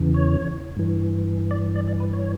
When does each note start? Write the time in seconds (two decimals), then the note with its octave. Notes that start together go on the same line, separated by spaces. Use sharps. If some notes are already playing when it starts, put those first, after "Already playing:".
Already playing: E2 C#3 E3
0.14 C#5
0.77 G2 E3
1.51 D5
1.76 D5
1.88 D5
2.00 B4
2.13 C#5